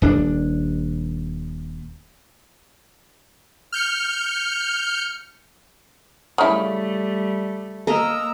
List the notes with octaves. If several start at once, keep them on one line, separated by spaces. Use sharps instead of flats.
D#1 D4
F6 G6 C#7
C#3 G3 A3 E4
A#3 A#4 D#5 A#5 E6